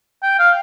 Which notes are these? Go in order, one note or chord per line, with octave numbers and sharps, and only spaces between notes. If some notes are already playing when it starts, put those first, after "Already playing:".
G5
F5